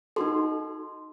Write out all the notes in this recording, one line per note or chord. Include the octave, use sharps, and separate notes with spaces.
D#4 F#4 A4 C6